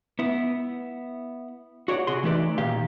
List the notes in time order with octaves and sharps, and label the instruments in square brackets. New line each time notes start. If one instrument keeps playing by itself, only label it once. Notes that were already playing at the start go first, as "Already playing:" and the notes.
[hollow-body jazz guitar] B3 E4
F#4 C#5 D5 F#5
C3 F#4 G#4 C6
E3 A3 D#4 B4 D5
A#2 D#3 G4 F5